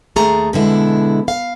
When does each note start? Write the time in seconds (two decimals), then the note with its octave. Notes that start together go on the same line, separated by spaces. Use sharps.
0.16 D#2 A3 G#4 A#5
0.53 B2 D3 G#3 E4
1.28 F5